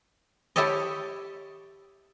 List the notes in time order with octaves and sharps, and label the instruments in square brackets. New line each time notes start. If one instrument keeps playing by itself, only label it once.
[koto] E4 G4 A4 C#5 D#5